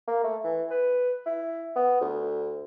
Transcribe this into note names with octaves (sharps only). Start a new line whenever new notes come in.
A#3
A3
E3
B4
E4
B3
D2